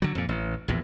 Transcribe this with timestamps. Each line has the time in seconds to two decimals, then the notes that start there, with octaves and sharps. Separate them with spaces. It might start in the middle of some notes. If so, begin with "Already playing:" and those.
0.02 D3 F#3
0.15 F2 A#2
0.29 A1
0.68 A#1 E2 A2